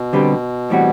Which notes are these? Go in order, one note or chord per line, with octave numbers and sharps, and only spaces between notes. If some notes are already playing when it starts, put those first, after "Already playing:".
Already playing: B2
D3 G3 C4 G4 B4
A2 E3 G3 C4 F#4